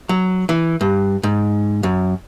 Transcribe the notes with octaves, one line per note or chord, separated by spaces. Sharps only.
F#3
E3
G2
G#2
F#2